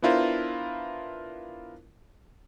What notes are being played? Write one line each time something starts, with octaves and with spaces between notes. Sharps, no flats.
B3 D4 E4 F4 A#4 C5